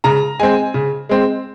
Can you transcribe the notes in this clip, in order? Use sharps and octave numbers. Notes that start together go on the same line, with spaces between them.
C#3 A#5
G#3 C4 G#5
C#3
G#3 C4